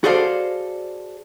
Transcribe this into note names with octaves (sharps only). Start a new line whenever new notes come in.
F#4 G#4 A4 C5 D5 F5